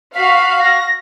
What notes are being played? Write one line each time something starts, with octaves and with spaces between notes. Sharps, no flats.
F#4 F5 B6
A#6